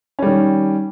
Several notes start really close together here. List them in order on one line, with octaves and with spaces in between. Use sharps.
C#4 G3 D#3